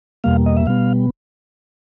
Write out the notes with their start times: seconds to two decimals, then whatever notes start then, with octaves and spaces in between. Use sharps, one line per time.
0.24 E2 B2 G3 A#3 F5
0.46 D#5
0.57 E5
0.66 B2 G3 B3 F5